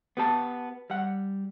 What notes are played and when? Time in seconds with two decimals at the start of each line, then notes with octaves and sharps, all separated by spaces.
0.17 B3 G4 A5
0.90 G3 F#5